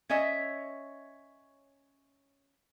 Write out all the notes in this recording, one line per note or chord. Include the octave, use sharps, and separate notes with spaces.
C#4 C#5 D#5 E5